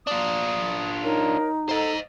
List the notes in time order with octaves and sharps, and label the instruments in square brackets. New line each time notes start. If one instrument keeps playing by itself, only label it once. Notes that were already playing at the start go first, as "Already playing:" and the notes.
[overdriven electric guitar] D4 F4 [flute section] D#6
[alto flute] D#4 [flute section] A#4 C#5
[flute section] A4 A#5 [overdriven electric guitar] C5 D#5